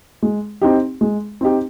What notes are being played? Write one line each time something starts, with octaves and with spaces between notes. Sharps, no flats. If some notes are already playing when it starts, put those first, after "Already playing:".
G#3
C4 D#4 G4
G#3
C4 D#4 G4